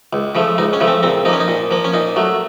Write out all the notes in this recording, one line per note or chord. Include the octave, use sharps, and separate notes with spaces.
C#2
C#3 F3 A3
C#2 D#4
C#4
C#3 F3 A3
C4
A#2 C4
F3 A#3 C#4 D#4
D#4
A#2
F3 A#3
C#4
A#2 D#4
F#3 A3